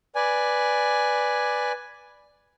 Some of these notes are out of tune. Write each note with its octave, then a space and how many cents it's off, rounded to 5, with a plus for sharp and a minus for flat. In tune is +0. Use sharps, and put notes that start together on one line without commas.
B4 +0 D5 +0 G#5 +0